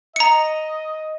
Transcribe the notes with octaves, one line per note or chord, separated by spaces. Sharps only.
D#5 A#5 C#7